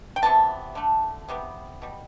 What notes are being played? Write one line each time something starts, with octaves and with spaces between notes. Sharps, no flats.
G5
C3 E3 G3 B3 A5
D3 A3
C3 G3 B3
B2 G3